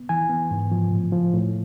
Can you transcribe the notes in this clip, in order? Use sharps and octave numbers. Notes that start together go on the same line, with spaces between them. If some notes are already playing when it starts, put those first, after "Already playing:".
Already playing: B3
E3 G#5
B3
G#2
F3
A2
F3
A2